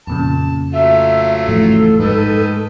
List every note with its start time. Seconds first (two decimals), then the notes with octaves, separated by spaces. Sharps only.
0.07 F2 A#2 C#3 A5
0.73 F#3 A3 F4 E5
1.47 A1 A2 F3 A4
2.00 G#2 D#3 B4 D#5